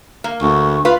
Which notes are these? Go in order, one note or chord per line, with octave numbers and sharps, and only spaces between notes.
A#3
D2 C#6
F4 B4 F5